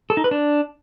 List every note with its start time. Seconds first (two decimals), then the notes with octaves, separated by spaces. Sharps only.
0.10 A4
0.17 D#4
0.24 B4
0.31 D4